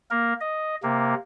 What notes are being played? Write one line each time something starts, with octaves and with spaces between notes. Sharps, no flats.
A#3 A#4
D#5
C3 A#3